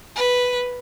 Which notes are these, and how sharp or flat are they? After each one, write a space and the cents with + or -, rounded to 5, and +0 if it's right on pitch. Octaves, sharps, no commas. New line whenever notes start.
B4 +0